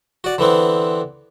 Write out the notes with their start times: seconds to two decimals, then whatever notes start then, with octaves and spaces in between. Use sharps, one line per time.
0.24 F#4 D5
0.38 D3 E3 B3 C4